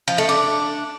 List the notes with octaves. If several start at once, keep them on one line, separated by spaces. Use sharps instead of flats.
F3
A3
D4